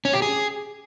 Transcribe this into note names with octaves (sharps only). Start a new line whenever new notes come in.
C#4
G4
G#4